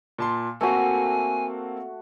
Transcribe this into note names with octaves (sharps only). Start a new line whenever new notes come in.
A#2 A5 C6
A3 A#3 C4 F#4 A4 G#5